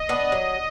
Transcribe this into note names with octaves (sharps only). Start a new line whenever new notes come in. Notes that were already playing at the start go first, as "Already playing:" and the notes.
Already playing: D#5
B3 D4
F#3